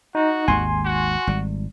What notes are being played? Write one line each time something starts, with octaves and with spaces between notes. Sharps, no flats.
D#4 F#4
G#1 D#2 G#3 G#5 C6
F#4
G#1 G3